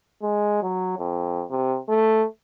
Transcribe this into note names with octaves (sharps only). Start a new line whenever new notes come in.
G#3
F#3
F2
C3
A3